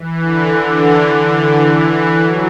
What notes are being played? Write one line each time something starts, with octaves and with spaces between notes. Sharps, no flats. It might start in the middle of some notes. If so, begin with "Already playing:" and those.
Already playing: E3
D3
E3
D3
E3
F#3